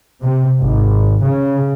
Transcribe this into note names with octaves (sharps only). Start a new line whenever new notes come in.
C3
G#1
C#3